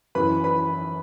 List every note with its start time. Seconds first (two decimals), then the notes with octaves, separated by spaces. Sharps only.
0.15 F#2 E3 B4 B5
0.44 B4 B5